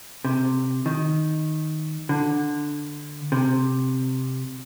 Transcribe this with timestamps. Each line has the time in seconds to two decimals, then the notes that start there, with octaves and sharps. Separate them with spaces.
0.25 C3
0.86 D#3
2.09 D3
3.32 C3